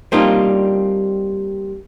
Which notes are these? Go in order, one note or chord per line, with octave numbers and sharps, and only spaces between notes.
G3 A#3 C4 D4 D#4 F4